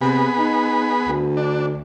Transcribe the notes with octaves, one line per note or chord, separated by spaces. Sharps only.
C3 B3 G#4 B5
D#4
D2
D4